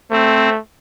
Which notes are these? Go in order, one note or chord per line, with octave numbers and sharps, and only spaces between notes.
A3 C4